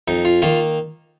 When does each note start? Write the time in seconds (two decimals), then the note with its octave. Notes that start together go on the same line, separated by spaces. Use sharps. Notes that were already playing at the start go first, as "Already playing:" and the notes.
0.08 F2 D#4
0.25 F4
0.42 D#3 A#3 F4